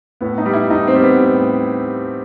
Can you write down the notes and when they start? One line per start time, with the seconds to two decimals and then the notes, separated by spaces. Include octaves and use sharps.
0.21 A2 B3
0.38 D#4
0.46 G3
0.53 E4
0.70 A2 D#4
0.87 C4
0.95 G3
1.03 B3
1.20 A2